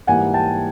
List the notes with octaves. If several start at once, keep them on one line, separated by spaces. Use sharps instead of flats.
G#2 E3 G3 A#3 F#5 G#5
G5 A5